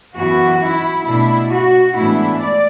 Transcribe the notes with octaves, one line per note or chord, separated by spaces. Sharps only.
F#2 E3 B3 E4 F#4
E4
B2 A3 D4 E4
F#4
A2 E3 G#3 B3 D4 E4
D5